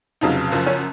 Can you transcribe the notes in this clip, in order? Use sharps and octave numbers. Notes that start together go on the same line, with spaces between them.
F1 F2 C#3 F#3 D#4
F#1 F#2 F3
C#4